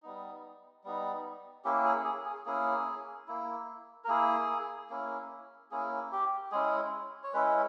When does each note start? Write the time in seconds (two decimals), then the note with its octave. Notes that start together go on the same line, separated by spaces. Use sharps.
0.03 G3 B3 D#4
0.84 G3 B3 D#4
1.65 A#3 C#4 E4 G4
1.85 G#4
2.05 G#4
2.26 G#4
2.46 A#3 C#4 E4 G#4
3.28 A#3 E4
4.04 A#4
4.08 A#3 E4 G#4
4.90 A#3 C#4 E4
5.71 A#3 C#4 E4 G#4
6.12 G4
6.52 G#3 C#4 E4 G#4
7.24 C#5
7.33 G#3 C#4 E4 B4